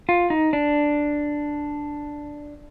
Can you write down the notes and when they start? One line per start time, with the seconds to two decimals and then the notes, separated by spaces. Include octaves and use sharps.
0.09 F4
0.30 D#4
0.53 D4